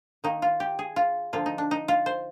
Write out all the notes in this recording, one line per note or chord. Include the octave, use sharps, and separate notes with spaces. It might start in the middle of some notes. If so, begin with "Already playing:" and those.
D#3 A#3 D#4
F4
G4
G#4
F4
D3 F3 A#3 F4
D#4
D4
D#4
F4
C5